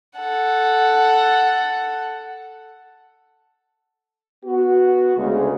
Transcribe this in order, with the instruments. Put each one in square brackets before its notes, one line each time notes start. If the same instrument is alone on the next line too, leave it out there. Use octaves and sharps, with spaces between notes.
[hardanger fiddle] A4 F#5
[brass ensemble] B3 F#4
D2 C#3 G#3